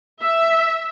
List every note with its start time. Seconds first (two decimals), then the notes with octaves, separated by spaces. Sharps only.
0.21 E5